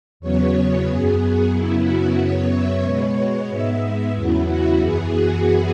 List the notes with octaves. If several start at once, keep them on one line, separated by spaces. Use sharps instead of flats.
E2 C#3 F#3 B3 C#5
F#2 F#3 B3 G#4
F#2 C#3 F#3 B3 E4
F#4
F#2 C#3 F#3 B3 C#5
E5
B2 G#3 B3 C#5
G#2 G#3 B3 E5
E2 C#3 F#3 B3 E4
F#4
F#2 E3 B3 G#4
F#4